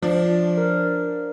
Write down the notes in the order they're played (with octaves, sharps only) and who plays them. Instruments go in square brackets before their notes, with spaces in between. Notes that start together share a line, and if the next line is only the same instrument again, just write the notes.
[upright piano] F3 [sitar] D4
[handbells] A#4